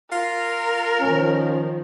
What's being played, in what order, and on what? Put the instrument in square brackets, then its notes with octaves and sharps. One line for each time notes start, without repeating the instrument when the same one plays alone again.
[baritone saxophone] F4 [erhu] A#4
[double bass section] D#3 F3 [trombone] C#4